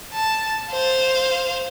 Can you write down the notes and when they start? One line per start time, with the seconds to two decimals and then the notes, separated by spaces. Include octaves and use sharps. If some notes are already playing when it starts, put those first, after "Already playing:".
0.13 A5
0.71 C5 F5